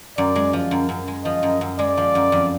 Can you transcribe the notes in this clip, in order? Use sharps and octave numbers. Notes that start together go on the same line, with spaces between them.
F#2 D5
G#3
F3
F#2
F#2
G#3
F3 D#5
F#2
F#2
G#3 D5
F3
F#2
F2